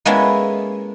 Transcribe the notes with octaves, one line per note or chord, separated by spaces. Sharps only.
G#3 A#3 B3 C#4 E4 A4